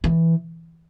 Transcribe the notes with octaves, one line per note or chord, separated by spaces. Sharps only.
E3